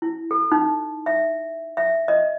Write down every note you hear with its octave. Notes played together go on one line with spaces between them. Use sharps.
E4
A4
D#4
E5
E5
D#5